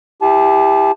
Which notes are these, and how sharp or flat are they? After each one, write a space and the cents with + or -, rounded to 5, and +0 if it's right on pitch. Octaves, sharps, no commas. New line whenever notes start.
E4 +0 G4 +15 A5 -30